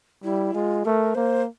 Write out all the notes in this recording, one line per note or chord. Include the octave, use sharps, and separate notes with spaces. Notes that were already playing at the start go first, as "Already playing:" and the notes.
G3 E4
G#3 F4
A3 A#4
A#3 C5